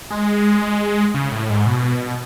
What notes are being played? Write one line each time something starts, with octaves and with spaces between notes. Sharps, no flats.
G#3
C#3
A2
G#2
B2